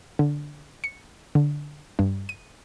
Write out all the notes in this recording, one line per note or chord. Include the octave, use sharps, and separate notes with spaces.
D3
C#7
D3
G2
D#7